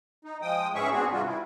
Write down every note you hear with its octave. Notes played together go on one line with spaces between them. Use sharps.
D#4
F3 G#3 G5 D#6
G#2 E3 C#4 G#4 E5 C#6
B3 C4 D4 F#4 G#4
C3 E3 G3 F4 F#4
E4